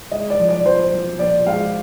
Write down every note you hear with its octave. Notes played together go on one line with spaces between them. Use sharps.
G#3 D#5
D5
F3
D5
F3 C5
F3
A#1 D5
G#3 F5